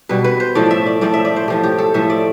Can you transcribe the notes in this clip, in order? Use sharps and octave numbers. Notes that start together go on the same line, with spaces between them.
B2 G3 B4
B4
C5
A2 F3 A3 D5
E5
D5
A2 F3 A3 D5
E5
D5
C5
A2 F3 A3 G4
G4
A4
A2 F3 A3 E5
D5